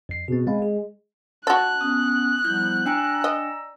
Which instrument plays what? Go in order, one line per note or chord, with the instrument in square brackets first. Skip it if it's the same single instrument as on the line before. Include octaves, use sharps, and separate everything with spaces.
[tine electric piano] F2 C7
[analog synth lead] B2 [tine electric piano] C4 G#4
[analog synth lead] G#3 [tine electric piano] C4 F5 B5
[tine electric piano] G#4
[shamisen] F#4 A4 [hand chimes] D5 [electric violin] F#6
[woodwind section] B3 C#4 [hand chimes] D#6
[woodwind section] F3 G3 B3 [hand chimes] E4 F6 G6
[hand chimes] D4 G5 G#5 [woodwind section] D5 A#5 E6
[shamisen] D#5